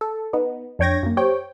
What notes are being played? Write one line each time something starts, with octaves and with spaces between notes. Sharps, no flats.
A4
B3 D#4
F2 D4 C#5 G5 G#6 A#6
F#2 A#3
G4 C5 C#5 G5